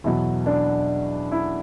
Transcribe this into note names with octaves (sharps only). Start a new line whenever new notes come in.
E2 B2 F#3 E4
D4
E4